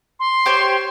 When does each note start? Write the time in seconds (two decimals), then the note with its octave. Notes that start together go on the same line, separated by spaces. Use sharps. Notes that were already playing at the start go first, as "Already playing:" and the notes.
0.20 C6
0.46 G4 C5 C#5